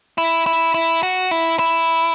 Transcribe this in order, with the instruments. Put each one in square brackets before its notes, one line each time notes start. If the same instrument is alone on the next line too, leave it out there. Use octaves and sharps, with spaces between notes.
[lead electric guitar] E4
E4
E4
F#4
E4
E4